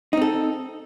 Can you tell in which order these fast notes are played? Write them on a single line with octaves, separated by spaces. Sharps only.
D#4 C4 A4